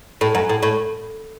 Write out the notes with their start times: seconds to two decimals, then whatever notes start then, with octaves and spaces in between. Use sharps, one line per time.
0.21 A2
0.35 F#2
0.49 A2
0.63 A2